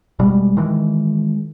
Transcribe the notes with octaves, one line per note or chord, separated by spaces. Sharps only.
E1 B2 G3 G#3
D#3 E3 G#3